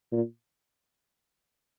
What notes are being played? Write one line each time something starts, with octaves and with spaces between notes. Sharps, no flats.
A#2